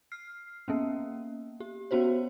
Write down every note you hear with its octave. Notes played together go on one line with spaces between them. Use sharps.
F6 C7
A#3 B3 C#4
G4
B3 C#4 F#4 C5 C#5